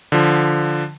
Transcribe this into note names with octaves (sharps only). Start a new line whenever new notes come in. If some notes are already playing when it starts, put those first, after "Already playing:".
D3 F3